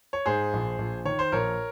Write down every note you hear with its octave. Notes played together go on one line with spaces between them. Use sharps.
C#5
G#2 G#4 C5
A#1
A#1
D#3 C#5
C5
A#1 A#4 C#5